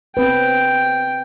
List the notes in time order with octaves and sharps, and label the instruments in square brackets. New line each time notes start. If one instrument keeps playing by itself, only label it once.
[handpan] C4 B4 [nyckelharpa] G5